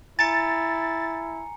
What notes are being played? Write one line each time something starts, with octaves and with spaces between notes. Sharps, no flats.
E4 G#5 A#5 A6 C#7